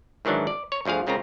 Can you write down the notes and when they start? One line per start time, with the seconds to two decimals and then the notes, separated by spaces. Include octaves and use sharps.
0.25 G#2 D#3 E3 F#3 D4
0.47 D5
0.72 C#5
0.85 G1 D2 F3 G#4 F5
1.07 C#2 C#3 C4 F4 A#4 A#5